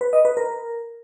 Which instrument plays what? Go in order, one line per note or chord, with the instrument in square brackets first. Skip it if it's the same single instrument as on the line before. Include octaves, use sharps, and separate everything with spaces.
[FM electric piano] B4
D#5
B4
A#4